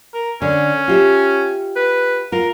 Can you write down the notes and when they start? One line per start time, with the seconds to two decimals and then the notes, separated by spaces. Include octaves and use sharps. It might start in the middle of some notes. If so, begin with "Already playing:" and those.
0.14 A#4
0.42 D3 C#4
0.88 F4 G4 E5
1.76 B4
2.32 F4 A#4